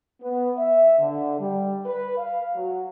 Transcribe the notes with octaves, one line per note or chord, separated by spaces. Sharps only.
B3
E5
D3
G3
B4
F5
F#3